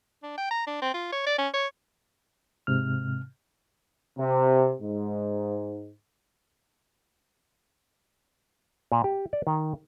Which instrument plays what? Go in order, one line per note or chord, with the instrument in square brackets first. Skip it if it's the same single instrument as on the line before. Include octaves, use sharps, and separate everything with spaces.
[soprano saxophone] D4
G5
A#5
D4
C4
F4
C#5
D5
C#4
C#5
[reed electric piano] G#2 C3 F6
[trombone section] C3
G#2
[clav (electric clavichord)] A#2
G4
D5
D#3